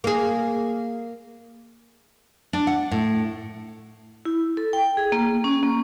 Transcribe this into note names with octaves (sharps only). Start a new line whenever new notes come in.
A#3 G#4
D4
F#5
A2
E4
A4
G5
G#4
A#3
C#4
A#3